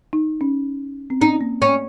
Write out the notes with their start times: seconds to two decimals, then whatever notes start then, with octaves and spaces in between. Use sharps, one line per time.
0.13 D#4
0.41 C#4
1.10 C4
1.21 C#4 D#4
1.41 A#3
1.62 C#4